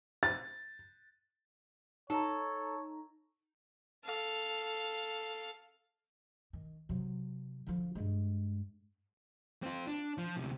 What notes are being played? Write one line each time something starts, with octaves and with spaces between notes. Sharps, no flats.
A6
D#4 A4 C#5 A#5
A4 F5
D#3
C3 F#3
D3 F3
G2 G#3
C4 F4
D4
F3
D2 C3